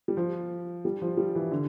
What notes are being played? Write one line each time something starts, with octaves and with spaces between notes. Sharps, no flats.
G3
F3
G3
F3
G3
E3
D3